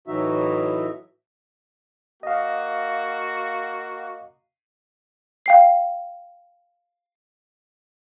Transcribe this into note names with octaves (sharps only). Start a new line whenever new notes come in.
A2 E3 F#3 D#4 F#4 E5
A#3 F#4 D#5 F5
F5 G5 C7